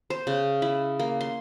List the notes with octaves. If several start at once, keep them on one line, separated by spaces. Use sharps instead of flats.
C5
C#3
E4
A#3
C6